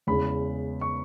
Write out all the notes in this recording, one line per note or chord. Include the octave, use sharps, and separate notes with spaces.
E2 C#3 G#3 B5
C#6